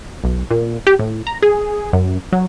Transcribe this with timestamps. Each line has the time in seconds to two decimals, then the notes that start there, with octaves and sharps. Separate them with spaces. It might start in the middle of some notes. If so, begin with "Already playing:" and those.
0.24 B1
0.51 A#2
0.87 G4
0.99 A2
1.27 A#5
1.42 G#4
1.93 F#2
2.32 F#3